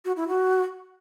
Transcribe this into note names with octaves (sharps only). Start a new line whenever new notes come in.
F#4
E4
F#4